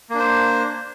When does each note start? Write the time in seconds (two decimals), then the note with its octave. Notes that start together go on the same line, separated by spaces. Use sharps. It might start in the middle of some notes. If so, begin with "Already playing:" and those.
0.10 A#3
0.15 D4
0.19 C5